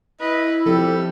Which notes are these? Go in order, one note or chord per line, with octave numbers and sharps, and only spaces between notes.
E4 B4 D#5
F3 G3 C4 G4 A4